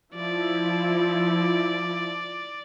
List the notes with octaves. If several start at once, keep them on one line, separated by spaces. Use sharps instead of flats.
F3 E4 D5